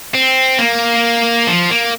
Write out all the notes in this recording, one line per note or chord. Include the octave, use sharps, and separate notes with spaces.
C4
A#3
F3
A#3